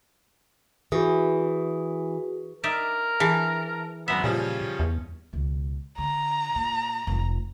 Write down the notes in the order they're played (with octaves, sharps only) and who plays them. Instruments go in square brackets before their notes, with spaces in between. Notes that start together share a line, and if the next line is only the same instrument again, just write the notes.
[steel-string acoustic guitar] E3 [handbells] F#4 G#4
[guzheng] D#4 D5 E5 [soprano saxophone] A#4
[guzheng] E3 [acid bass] G#4 [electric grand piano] A5
[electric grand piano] G#1 F#2 A#6 [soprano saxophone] B3 [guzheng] E5
[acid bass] A#2 [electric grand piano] C#3 F3 G3 [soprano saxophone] C#4
[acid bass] E2
[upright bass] C#2 B2
[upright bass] D3 [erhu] A#5
[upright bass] A#2
F1 F3